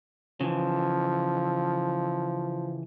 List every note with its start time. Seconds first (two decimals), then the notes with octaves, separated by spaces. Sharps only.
0.41 C#3 E3 F3